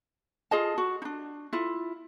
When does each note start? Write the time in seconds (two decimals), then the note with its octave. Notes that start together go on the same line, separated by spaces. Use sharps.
0.51 F4 G#4 D#5 A5
0.78 F#4
1.02 D4 D#4
1.53 E4 F4